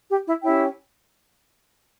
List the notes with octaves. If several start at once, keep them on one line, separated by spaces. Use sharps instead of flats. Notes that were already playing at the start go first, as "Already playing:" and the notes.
G4
E4
C#4 E4 G4 C#5 G5